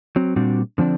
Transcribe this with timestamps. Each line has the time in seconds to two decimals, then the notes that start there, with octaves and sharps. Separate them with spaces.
0.16 F#3 C4
0.36 A#2 G3 C4 D4 F#4
0.78 D3 F3 C4 D4